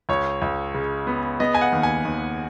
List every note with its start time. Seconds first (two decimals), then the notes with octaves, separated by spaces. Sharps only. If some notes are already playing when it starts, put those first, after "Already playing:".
0.09 C#2 C#5
0.42 C#2
0.74 C#3
1.07 B3
1.40 B3 D#5
1.55 G#5
1.61 F#5
1.72 D#2
1.83 G#5
2.05 D#2